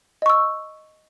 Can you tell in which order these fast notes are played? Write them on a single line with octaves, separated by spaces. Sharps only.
D#5 C#6 E6